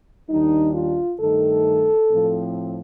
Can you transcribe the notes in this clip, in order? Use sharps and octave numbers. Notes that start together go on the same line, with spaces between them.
D#2 D#3 G3 D4 D#4
F4
G2 D#3 A3 D#4 A4
A2 F3 C4